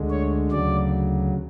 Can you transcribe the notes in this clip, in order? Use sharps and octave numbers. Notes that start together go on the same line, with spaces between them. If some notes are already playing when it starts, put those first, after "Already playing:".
Already playing: D2 D3 G#3
C#5
D2 C#3 F#3 D5